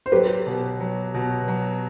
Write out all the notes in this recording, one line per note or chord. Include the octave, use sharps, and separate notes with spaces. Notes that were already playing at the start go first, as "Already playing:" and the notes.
C5
F#3 G4 B4
B2
F#3
B2
F#3